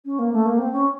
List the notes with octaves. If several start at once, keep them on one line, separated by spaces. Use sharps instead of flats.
C#4
A#3
A3
A#3
C4
C#4